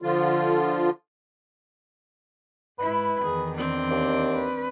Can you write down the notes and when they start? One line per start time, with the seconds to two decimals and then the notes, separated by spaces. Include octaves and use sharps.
0.02 D3 F3 F4
2.79 G#2 E4 B4
3.22 E2 D#3 G#4
3.55 C4 D4
3.91 D#2
4.36 B4